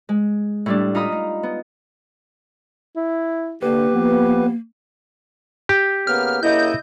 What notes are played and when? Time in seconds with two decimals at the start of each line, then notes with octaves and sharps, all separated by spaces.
0.09 G#3
0.66 A2 G3 D4
0.95 D#4 F4 D#5 A#5 B5 D#6
1.12 D#4
1.43 B3
2.96 E4
3.63 D3 A#3 G4 B4
3.92 F3 B3
5.69 G4
6.07 C#3 A#3 B3 F6
6.43 C#3 A#3 E4 D#5 G6